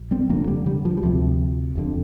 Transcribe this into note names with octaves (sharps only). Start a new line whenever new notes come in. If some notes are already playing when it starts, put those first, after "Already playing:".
Already playing: A#1
G3 C4
F1 F2 D3 F3 A#3
D3 G3
D3 G3
F3
G3
D2 C3 F3
F1 F2 D3